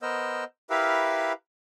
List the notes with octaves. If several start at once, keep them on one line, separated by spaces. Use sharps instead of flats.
B3 A#4 C5 D#5 E6
E4 G4 A#4 B4 E5 F5